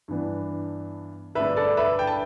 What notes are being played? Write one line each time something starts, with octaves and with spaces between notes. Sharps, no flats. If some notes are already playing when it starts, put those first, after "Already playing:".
G2 E3 B3 D4
G2 D3 A3 D4 B4 E5
A4 D5
B4 E5
G5
A5